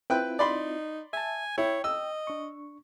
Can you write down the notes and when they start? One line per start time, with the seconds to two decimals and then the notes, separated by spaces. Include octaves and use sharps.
0.10 C4 E4 F4 B4 G5 F#6
0.39 D#4 D5 B5 C6
1.13 E5 G#5 A5
1.58 E4 C#5 G5
1.84 D#5 E6
2.27 D4 C#6